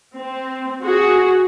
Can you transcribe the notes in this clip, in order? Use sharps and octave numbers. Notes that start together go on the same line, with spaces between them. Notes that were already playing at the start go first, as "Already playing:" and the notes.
C4
F#4 G#4